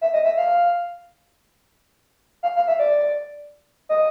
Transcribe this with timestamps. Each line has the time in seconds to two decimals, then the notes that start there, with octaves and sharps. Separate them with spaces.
0.01 E5
0.14 D#5
0.25 E5
0.37 F5
2.43 F5
2.56 F5
2.68 E5
2.79 D5
3.89 D#5